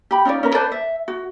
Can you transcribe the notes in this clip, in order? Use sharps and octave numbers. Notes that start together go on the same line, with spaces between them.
G4 B5
C#4 D#4 F4 D5
C#4 A#4 B4
B4 C5 D5 A5
E5
F#4